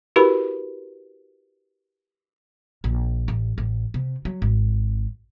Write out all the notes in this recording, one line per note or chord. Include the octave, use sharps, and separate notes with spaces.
E4 F#4 G4 A#4 B4 B5
A#1
A1
A1
C3
F#3
G#1